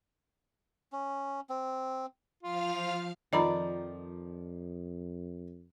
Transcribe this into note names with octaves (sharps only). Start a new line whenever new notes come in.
C#4
C4
F3 F4 F5 F6
F2 D#3 F3 D5 D#5 A#5 B5